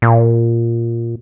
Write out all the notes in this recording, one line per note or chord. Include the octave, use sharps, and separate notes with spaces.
A#2